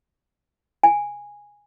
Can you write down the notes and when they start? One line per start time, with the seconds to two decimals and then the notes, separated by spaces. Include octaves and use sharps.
0.83 G#5